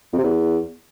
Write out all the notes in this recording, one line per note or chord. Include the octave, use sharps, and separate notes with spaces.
F2
C3
E2